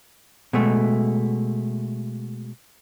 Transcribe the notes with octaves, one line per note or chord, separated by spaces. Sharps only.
B2 G#3 A3